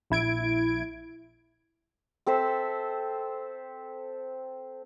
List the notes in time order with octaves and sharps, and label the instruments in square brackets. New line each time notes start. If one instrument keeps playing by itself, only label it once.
[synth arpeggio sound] A#1 E4 G#6 D7
[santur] C4 A4 C5 E5